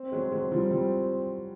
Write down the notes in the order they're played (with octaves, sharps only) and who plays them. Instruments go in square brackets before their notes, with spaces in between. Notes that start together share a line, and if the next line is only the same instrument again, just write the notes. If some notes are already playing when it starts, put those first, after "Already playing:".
Already playing: [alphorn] C4
[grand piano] F#3 G#3
F#3 G#3
F3 G3
F3 G3